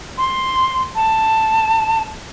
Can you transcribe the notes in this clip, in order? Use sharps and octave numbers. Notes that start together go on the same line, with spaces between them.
C6
A5